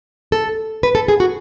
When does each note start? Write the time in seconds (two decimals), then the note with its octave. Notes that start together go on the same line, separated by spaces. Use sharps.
0.32 A4
0.83 B4
0.95 A4
1.08 G#4
1.20 F#4